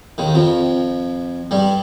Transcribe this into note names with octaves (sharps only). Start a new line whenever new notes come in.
D#2 D#3
F2 F3
G2 G3